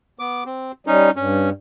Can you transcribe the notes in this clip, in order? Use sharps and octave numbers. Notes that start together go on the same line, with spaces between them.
B3 D6
C4
G3 C#4 D#4
G2 C#4